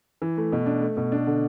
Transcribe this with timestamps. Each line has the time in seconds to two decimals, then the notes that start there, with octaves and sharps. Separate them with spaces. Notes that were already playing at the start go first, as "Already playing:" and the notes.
0.22 E3
0.37 A3
0.52 B2
0.66 D4
0.82 A3
0.97 B2
1.12 D4
1.27 D3